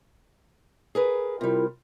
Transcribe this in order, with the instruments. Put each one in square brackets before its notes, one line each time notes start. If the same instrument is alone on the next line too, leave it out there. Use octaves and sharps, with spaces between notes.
[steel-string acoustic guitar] G#4 A#4 B4
[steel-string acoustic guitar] C3 G3 [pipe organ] E4 F4 A#4